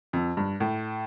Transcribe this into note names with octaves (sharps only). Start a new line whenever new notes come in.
F2
G2
A2